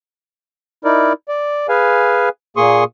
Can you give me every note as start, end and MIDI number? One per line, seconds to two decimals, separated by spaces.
0.85 1.13 63
0.85 1.13 64
0.85 1.13 70
0.85 1.13 74
1.29 1.67 74
1.69 2.29 68
1.69 2.29 71
1.69 2.29 77
1.69 2.29 80
2.57 2.84 46
2.57 2.84 58
2.57 2.84 68
2.57 2.84 84
2.57 2.84 85
2.57 2.84 87